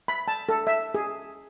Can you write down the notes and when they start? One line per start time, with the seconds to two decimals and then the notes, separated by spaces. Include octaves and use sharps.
0.08 B5
0.28 A5
0.49 A4
0.67 E5
0.95 G#4